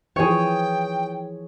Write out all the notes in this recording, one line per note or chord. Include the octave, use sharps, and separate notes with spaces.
E3 F3 G#4 C#5 G5